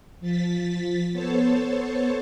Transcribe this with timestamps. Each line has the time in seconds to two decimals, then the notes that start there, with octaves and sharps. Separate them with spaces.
0.20 F3 A6 B6
1.13 B3 A4 C5 C#5 A5